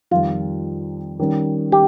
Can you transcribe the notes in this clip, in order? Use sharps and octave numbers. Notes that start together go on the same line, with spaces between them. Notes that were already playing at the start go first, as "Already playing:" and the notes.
F2 D#3 G3 F4
D#3 G3 C#4
G4